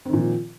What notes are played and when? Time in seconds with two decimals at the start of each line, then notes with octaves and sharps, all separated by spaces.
0.05 C4
0.09 D#3
0.13 A#2
0.17 F3